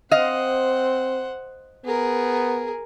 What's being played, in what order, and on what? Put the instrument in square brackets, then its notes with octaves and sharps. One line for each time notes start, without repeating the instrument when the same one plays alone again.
[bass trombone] C4 [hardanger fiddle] C5 F#5 [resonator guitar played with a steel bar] D#5 F5
[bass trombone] B3 [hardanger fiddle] G#4 A#4